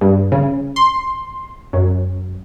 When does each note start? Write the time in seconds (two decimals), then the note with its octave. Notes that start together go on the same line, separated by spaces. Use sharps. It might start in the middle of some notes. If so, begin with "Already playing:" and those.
0.01 G2
0.32 C#3
0.76 C6
1.73 F#2